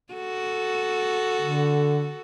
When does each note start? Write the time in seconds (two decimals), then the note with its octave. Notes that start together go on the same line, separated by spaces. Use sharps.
0.13 F#4 A4
1.41 D3